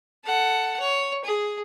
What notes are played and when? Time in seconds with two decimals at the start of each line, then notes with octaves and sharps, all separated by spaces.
0.24 A4 F#5
0.79 C#5
1.24 G#4